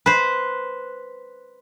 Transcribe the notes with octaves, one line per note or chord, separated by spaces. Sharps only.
B4 C5